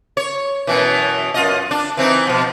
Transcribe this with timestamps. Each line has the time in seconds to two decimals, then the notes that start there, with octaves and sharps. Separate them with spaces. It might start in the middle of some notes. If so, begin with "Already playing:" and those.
0.17 C#5
0.67 F#2 B2 E3
1.34 F#2 F4 D#5
1.71 D4
1.97 E3 C4 D#4
2.27 B2 F3